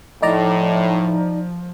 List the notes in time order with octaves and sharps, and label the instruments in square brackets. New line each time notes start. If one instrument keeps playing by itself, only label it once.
[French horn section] A2 [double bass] F3 [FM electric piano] D#4 D5 A#5